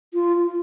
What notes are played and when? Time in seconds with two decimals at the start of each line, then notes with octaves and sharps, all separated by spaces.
0.14 F4